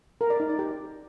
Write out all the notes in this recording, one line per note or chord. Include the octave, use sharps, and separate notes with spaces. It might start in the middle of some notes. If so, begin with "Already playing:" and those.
A#4
D5
D#4
D5
G4